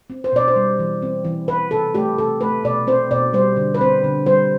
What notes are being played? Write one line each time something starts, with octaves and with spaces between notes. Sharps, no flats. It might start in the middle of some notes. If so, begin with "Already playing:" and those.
C4
C5
B2 D5
C5
G3
E3
C4
E3
E3 B4
C3 A4
A3 G4
C3 A4
A3 B4
B2 D5
C4 C5
B2 D5
G3 C5
D3
B4
C4 C5
D3
G3 C5